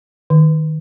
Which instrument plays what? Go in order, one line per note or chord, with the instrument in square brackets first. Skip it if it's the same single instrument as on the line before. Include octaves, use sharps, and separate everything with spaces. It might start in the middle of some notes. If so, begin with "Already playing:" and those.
[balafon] D#3